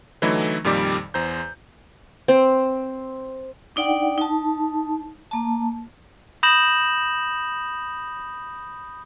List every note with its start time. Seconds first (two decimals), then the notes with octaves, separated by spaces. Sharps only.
0.22 D3 E3 F#3 A3 D#4 E4
0.64 F2 A#2 D#3 G3 D5 D6
1.14 E2 C5 A#5 G6
2.28 C4
3.76 D4 D#4 D5 F#5 G5
4.18 D#4 A5
5.31 A#3 A5
6.43 B5 D#6 G6 A#6 E7 F#7